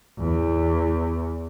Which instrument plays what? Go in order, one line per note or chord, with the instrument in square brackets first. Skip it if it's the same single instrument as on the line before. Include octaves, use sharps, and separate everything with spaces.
[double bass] E2